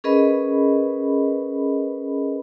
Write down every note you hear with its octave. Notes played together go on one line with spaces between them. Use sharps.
C#4 G#4 A#4 B4 D#5 B5